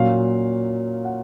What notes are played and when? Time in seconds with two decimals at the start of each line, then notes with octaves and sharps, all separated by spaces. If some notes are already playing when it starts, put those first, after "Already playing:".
Already playing: A#2 F#3 C#4 F5
1.05 F#5